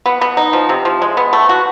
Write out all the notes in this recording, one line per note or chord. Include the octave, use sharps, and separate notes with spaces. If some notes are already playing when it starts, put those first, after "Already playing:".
B3
B3
D#4
F3
C3
F3
G#3
B3
A3
F#4